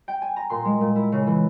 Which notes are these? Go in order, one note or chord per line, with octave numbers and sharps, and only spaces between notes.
G5
G#5
A#5
A#2 C6
G#3
A#2
E4
C#3
E3